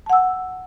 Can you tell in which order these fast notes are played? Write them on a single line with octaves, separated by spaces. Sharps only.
A5 F#5 E6